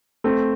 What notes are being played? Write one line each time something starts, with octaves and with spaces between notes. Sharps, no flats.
A3 C4